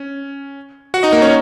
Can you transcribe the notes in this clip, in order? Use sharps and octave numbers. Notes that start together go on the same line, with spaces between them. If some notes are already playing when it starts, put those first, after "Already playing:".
Already playing: C#4
F#4 F#5
D#4 D#5
A#3 A#4
C#4 C#5